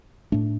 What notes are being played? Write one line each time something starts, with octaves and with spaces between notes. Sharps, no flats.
A2 A3 D4